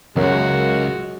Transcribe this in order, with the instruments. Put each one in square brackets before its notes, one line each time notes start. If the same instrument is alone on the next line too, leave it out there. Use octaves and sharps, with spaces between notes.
[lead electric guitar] C#2 [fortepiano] F#2 [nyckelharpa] G#3 F#4 [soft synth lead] A#4